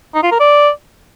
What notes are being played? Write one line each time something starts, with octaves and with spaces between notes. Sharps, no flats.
D#4
F4
A#4
D5